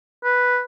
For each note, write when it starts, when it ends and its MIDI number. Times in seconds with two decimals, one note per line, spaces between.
0.24 0.61 71